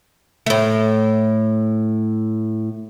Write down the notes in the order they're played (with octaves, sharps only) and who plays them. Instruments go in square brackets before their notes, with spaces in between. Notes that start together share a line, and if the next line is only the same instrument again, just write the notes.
[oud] A2 A3